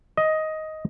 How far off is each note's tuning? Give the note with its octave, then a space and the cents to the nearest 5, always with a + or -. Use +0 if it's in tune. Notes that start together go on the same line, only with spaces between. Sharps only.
D#5 +10